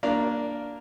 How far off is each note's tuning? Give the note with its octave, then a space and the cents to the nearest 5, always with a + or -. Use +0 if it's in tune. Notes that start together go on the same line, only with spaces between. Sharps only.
A#3 +0 D4 +0 F5 +0